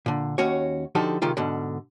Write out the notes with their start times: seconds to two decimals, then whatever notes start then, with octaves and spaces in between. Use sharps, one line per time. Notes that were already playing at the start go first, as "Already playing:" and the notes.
0.06 A#2 D3
0.38 D#2 C#4 F#4 C#5
0.95 D3 F3 D#4 F#4 G4 A4
1.22 C3 D#3 G#3 F4 G4
1.37 G#2 B2 D3